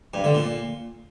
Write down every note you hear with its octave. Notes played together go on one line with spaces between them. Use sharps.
G2
D3
A#2